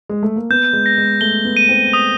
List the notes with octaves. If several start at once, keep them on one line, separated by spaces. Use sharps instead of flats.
G#3
A3
A#3
B3 G6
G#3
A#6
G#3
A3 G7
B3
D#7
C4
D#6